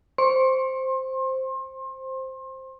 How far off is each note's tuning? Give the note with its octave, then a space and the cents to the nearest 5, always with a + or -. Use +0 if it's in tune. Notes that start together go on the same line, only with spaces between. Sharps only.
C5 +0 C6 +30